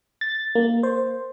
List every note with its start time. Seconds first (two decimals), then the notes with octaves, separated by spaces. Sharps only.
0.21 A6
0.55 A#3
0.83 C5